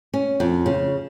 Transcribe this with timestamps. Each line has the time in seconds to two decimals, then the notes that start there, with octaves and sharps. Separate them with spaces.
0.14 C#4
0.40 F2
0.66 C#3